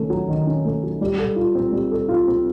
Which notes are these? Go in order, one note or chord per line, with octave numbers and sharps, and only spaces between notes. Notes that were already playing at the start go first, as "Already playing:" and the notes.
Already playing: D#3 A3 C#4
F#3
D#3
C#4
A3
F#3
G3
A4
F4
C4
G3
A4
F4
C4